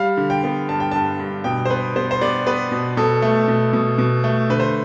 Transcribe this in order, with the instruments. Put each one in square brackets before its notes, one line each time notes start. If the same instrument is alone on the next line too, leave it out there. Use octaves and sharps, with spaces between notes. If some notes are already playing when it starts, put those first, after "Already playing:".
Already playing: [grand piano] G3 F5
D3
G5
B3
G2 A5
G5
G2 A5
G2
B2 G5
C5
B3 B4
B3 C5
C5
B3 D5
B3 B4
B2
B2 A4
A3
B2
B2
B2
A3
D3 B4
C5